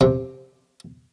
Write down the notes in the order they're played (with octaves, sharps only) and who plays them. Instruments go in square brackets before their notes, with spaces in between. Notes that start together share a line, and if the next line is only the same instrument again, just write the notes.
[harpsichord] C3